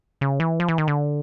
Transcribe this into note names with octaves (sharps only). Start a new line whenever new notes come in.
C#3
E3
F3
E3
D#3
D3